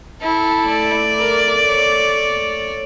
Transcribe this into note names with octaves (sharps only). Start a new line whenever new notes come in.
E4 A4
A3 D5
A#4
C#5